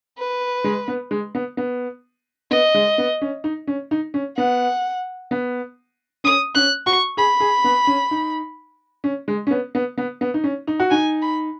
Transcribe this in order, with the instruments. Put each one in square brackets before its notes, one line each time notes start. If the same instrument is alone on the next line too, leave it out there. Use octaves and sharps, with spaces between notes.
[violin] B4
[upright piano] G#3
B3
G#3
B3
B3
[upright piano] B3 [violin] D#5
[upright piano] G#3
B3
C#4
D#4
C#4
D#4
C#4
[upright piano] B3 [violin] F#5
[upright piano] B3
[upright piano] C#4 [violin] D#6
[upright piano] C#4 [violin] F#6
[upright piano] F#4 [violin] C#6
[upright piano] G#4 [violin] B5
[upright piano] G#4
B3
C#4
D#4
C#4
G#3
C#4
B3
B3
B3
B3
D#4
C#4
D#4
F#4
[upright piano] D#4 [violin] G#5
[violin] B5